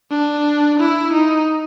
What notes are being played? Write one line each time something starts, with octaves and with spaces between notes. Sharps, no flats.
D4
E4
D#4